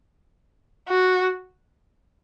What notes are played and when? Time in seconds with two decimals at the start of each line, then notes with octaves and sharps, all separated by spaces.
0.88 F#4